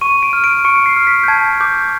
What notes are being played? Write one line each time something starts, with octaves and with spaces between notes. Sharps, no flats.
C#6 D#7
D7
F6
D7
C#6 C#7
C#7
C7
F6
B6
G6
A5 G#6
D6 G6